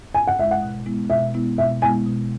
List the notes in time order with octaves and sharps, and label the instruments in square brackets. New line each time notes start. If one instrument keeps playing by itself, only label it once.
[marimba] G#2 [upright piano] G#5
[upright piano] F#5
[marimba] G#3 E4 [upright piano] E5
[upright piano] F#5
[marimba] B2
G#3 B3 E4
[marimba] B2 [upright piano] E5
[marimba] G#3 B3 E4
[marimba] B2 [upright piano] E5
[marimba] G#3 B3 E4 [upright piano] G#5
[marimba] B2